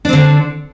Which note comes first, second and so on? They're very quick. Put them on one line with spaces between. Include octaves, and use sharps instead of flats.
D4 C4 D3